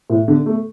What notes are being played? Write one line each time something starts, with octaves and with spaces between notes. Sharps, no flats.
A2
D3
A3